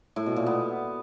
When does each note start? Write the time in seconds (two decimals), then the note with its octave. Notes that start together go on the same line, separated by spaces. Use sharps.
0.16 A2
0.26 B2
0.36 A#2
0.46 B3